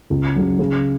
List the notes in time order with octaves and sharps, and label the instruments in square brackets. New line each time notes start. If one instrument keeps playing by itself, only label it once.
[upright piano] C#2
C#3 F#3
C#3